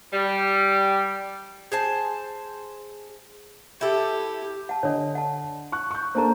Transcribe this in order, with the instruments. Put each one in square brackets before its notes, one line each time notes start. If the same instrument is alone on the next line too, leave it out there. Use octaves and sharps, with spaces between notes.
[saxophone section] G3
[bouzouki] G#4 C5 A5
[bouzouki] E4 A4 [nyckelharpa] G4
[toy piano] F#5 A5
[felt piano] D3 D#5 [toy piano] D4 C#5
[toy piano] F#5 A5
[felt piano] C#6 F#6
C#6 G6
[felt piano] A#3 D4 A4 [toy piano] C5 A5 A#5